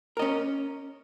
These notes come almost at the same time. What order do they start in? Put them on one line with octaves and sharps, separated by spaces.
A#4 D#5 C#4